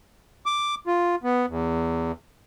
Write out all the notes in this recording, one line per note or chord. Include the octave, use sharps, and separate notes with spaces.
D6
F4
B3
E2